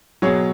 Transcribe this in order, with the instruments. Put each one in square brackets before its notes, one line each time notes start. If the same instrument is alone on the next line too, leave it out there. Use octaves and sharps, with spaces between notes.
[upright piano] B2 F#3 G#4 C#5